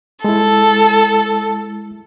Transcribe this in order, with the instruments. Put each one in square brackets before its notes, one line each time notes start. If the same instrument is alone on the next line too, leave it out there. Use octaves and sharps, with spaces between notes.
[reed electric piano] G#3 E4 [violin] A4